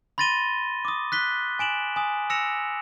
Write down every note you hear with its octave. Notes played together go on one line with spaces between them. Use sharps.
B5 C6 A6 A#6 D#7 G7
D6 D#6
F#6 B6 G7
G#5 D7 E7 F#7
G#5 D#6
E6 A#6 C#7 E7 F7